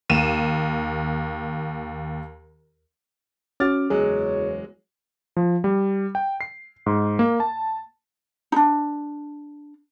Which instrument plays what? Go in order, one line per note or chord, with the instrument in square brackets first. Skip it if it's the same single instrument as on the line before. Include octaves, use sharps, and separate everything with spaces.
[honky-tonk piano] D#2 D#7 E7
[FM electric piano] C#4 F#4 [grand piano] D6 F6 A6
[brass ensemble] F#1 E2 C#5 [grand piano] F#3 G#3 [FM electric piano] G#4
[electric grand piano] F3
G3
G5
C7
G#2
A#3
A5
[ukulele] D4 D#4